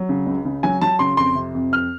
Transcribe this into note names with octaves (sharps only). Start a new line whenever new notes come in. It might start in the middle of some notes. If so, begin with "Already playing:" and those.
Already playing: F#3
C#3
C#2
C#3
F#3 G#5
F#3 A5
C#3 C6
F2 C6
C3
F2
F2 F6